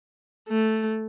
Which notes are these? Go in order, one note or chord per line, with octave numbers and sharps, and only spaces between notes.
A3